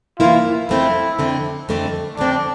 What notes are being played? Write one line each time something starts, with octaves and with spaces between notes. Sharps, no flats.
F2 C3 E3 A#3 E4 F4
F2 D3 A3 C4 E4
F2 D3 A3 C4
F2 D3 A3 C4
F2 D3 A3 C4 D4